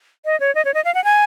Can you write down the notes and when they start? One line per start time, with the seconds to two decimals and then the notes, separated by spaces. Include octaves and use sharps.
0.25 D#5
0.40 C#5
0.55 D#5
0.65 C#5
0.74 D#5
0.85 F5
0.94 F#5
1.04 G#5